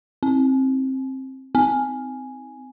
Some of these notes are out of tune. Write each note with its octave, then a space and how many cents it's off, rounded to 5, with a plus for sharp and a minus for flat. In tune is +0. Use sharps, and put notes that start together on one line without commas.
C4 +20
C4 -25